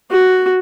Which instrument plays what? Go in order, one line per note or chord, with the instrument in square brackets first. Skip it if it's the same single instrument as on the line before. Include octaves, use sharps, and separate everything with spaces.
[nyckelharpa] F#4